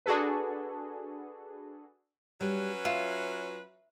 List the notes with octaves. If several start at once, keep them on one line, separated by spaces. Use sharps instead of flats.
D4 F#4 G#4 A4 B4
F#3 G3 C#4 B4
F4 E5